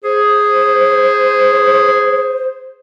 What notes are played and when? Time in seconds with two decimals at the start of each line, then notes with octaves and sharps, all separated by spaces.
0.04 G#4 C5